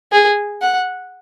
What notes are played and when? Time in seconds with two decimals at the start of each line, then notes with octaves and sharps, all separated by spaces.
0.12 G#4
0.62 F#5